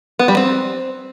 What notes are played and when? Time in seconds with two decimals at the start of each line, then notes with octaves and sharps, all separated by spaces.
0.19 B3
0.28 G3
0.37 C4